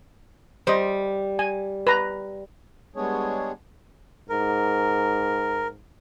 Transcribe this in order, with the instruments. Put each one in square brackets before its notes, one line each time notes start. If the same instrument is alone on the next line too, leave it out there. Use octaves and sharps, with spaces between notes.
[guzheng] G3 [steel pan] C5 D#5
[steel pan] G#5
B4 A#5
[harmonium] G3 G#3 B3 D4 G#4 C#5
[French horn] G#2 [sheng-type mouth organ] A#4